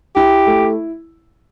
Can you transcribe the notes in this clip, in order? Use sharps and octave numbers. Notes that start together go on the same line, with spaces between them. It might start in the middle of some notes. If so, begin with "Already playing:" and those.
E4 G4
A3